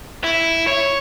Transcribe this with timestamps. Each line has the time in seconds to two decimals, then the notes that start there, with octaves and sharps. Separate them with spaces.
0.24 E4
0.67 C#5